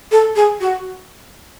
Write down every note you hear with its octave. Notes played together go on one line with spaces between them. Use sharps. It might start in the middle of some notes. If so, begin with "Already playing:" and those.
A4
G#4
F#4